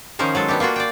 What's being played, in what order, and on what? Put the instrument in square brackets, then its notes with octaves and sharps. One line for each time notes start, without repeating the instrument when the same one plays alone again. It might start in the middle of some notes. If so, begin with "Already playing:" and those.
[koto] D#3 F3 C#4 D#4 A#4 C5
F#3 G#3 A4
B3 D4 G4
A#3 D4 F4 F#4
D5 G5